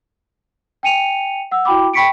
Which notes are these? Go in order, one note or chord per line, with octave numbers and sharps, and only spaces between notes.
G5 G#5 C#7 D#7 F7
F#5 E6
E4 F#4 G5 B5 D6
G5 B5 C#6 B6 C#7 D7